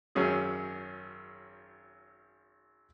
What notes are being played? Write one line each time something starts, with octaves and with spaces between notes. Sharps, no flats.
G#1 F#2 C#4 G#4